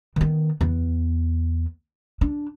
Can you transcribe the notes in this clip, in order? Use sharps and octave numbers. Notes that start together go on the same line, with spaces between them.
D#3 B3
E2 B3
D4